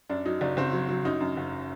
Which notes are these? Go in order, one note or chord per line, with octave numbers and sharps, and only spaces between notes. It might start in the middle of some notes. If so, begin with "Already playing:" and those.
F#2 D4
F#3 D#4
F#1 D4
F#1 C4
F#3
F#3
F#2 D#4
F#2
F#1